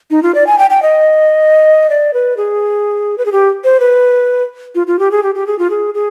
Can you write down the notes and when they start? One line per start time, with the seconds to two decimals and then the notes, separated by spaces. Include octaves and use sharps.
0.11 D#4
0.23 F4
0.35 D5
0.47 G#5
0.58 G5
0.70 G5
0.82 D#5
1.90 D5
2.14 B4
2.37 G#4
3.18 B4
3.26 G#4
3.32 G4
3.64 C5
3.80 B4
4.75 F4
4.87 F4
4.99 G4
5.11 G#4
5.23 G4
5.35 G4
5.47 G#4
5.59 F4
5.70 G#4
5.94 G#4